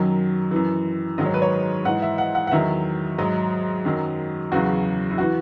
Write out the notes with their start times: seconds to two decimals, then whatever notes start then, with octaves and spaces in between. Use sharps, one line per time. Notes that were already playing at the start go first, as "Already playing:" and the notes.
Already playing: F#2 D#3 F#3
0.51 F#2 E3
1.18 G#2 D#3 F#3 D#5
1.26 C#5
1.34 B4
1.42 C#5
1.85 G#2 E3 F#5
2.02 E5
2.18 F#5
2.35 F#5
2.47 F#5
2.51 E2 D#3 F#3 E5
3.18 G#2 F#3 D#5
3.85 F#2 D#3 F#3
4.52 E2 C#3 F#3 F#4
5.11 E4
5.18 E3 F#4